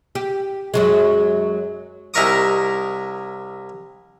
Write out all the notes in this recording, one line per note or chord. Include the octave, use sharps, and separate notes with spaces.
G4
F#2 F#3 G#3
C2 D#4 E4 A#4 C#6 D#6